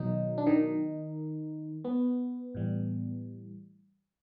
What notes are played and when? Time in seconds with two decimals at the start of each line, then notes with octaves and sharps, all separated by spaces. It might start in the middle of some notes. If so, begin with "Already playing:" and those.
Already playing: B2 D#3 F#3 D#4
0.38 D4
0.46 D#3 D#4
1.85 B3
2.55 A2 E3 G3